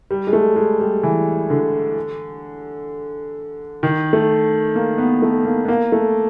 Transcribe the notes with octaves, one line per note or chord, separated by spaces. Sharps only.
G3
G#3
A3
G#3
G3
E3
D3
D#3
A3
A#3
B3
A3
A#3
B3
A#3
A3